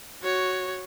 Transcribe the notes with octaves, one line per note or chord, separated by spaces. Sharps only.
F#4 C#5